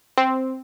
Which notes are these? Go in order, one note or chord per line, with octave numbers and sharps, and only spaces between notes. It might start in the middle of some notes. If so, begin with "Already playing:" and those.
C4